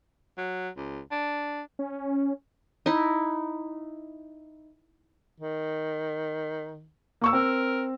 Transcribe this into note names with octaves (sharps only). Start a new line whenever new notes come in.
F#3
C#2
D4
C#4
D#4 E4
D#3
A#3 C#6 E6
C4 A#4